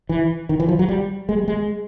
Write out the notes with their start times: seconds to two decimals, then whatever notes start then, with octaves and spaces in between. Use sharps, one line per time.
0.09 E3
0.49 D#3
0.60 E3
0.69 F3
0.79 F#3
0.89 G3
1.29 G#3
1.39 G3
1.48 G#3